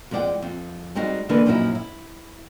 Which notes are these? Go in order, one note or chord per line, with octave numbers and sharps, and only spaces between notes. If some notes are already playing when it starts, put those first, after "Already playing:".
F2 G#3 E4 D5 F#5 G5
F2
G3 G#3 C4 D#4 F#4
D3 E3 G#3 A#3 D4 B4
F#2 A#2 F3 F#3 D#4 E4
E4